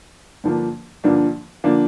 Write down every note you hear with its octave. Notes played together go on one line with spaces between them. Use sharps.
G2 D3 F3 A#3 D4
G2 D3 F3 A#3 D4
D3 F3 A#3 D4